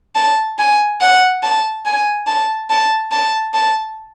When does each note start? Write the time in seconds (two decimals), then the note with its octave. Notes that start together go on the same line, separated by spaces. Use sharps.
0.15 A5
0.59 G#5
1.01 F#5
1.43 A5
1.86 G#5
2.27 A5
2.70 A5
3.11 A5
3.54 A5